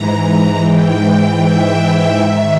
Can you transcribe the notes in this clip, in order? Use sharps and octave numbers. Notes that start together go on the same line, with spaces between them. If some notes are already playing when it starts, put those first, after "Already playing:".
Already playing: G#2 E3 A#5
G#2 E3 G5
E5
G#2 D#3 E5